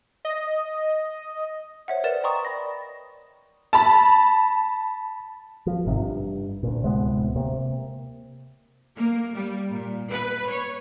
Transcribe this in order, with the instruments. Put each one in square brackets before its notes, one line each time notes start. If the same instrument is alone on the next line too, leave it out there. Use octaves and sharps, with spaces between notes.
[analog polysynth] D#5
[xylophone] C5 C#5 E5 F#5
A#4 B4 D5 A6 E7
D#5 G5 A#5 C6 C#6 D#6
D5 B5 A#6
[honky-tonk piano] A5 B5
[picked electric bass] F3
G#1 C3 D#3
G2
D2 A#2
D1 C3 G#3 B3
C3 A#3
[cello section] A#3
G3
A#2
B4
C#5